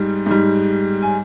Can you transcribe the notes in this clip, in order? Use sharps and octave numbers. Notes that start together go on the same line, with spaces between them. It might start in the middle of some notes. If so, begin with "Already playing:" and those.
Already playing: G#2 G3
G#2 G3
G#5